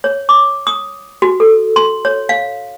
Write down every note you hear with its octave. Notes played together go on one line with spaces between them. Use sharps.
C#5
D6
D#6
F#4
A4
C6
C#5
F5